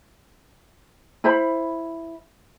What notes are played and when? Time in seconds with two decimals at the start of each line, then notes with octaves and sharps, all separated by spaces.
1.24 E4 C5 B5